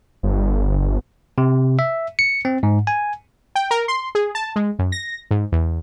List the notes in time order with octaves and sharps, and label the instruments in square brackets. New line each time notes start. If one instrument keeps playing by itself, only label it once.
[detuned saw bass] G1
[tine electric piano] C3
E5
C#7
C4
G#2
G#5
[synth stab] G5
A#4
C6
G#4
A5
G#3
F#2
A#6
G#2
E2